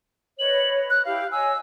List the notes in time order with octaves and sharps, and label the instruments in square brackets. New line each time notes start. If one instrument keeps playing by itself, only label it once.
[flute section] B4 C#5 D#5 [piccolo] F#7
[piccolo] F#6
[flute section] E4 G4 [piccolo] F5
[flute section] C#5 D#5 G#5 [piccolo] E6